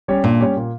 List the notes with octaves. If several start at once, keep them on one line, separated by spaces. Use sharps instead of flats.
G3 C#4 G4 C#5
G2 A#2
G3 C#4 G4 C#5
A#2